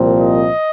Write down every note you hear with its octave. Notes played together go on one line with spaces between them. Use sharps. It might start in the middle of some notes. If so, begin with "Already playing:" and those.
Already playing: C2 A#2 F3 C4
D#5